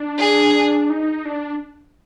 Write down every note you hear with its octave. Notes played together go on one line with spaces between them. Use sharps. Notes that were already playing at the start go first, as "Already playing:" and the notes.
Already playing: D4
G#4
D#4
D4